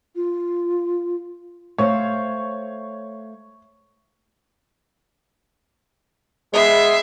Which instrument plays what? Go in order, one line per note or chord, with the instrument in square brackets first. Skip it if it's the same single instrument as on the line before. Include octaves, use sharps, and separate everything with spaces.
[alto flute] F4
[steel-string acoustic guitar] A3 C5 F5 [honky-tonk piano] C#5
[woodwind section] G#3 B3 [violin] E5 C7